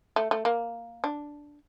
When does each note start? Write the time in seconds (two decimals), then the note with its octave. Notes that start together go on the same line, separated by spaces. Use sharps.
0.16 A3
0.31 A3
0.45 A#3
1.04 D4